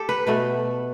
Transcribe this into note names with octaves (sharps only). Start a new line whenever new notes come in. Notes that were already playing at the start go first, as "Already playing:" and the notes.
Already playing: G4 A4
B4
B2 A3 B4